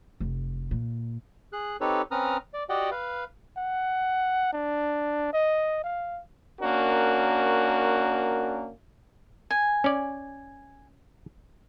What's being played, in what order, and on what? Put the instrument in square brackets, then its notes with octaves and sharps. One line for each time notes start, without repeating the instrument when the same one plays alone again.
[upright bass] F1
A#2
[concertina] G#4 F#6
C4 D#4 G4 A4 B4 C#5
C4 C#4 B4 A#5 D#6 F6
D5
F#4 G4 D5 D#5 F#5 G5
B4 F5
[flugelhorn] F#5
D4
D#5
F5
[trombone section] A#3 C#4 D4 F#4 A#4
[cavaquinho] G#5
[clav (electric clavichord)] C#4 D5